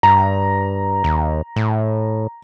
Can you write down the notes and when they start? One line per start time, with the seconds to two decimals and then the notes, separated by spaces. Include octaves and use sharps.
0.03 G2 A#5
1.04 D#2
1.56 A2